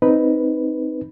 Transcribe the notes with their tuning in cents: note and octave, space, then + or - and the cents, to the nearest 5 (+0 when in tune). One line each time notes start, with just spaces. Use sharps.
C4 +0 D#4 +0 B4 +0